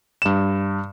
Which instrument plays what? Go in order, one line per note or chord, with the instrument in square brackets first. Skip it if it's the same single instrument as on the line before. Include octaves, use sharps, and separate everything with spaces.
[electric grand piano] G2 E7